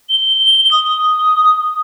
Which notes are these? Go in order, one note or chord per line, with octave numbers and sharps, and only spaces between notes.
G7
D#6